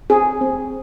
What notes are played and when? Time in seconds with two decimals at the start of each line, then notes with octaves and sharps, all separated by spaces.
0.10 C4 G#4
0.41 C4